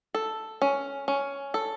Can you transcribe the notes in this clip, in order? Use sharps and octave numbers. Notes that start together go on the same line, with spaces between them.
A4
C#4
C#4
A4